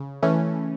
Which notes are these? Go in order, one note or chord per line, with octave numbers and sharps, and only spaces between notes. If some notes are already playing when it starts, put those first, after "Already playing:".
Already playing: C#3
E3 A3 C#4